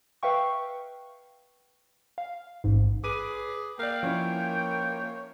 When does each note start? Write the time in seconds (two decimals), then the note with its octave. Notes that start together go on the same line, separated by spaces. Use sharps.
0.23 B4 E5 F5 G5 C#6
2.18 F5
2.64 A1 G#2
3.04 G#4 B4 D6 D#7
3.79 A#3 A#4 D5 F5 G5
4.03 F3 C#4 E4 C#5